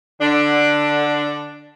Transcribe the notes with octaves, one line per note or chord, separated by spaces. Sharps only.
D3 D4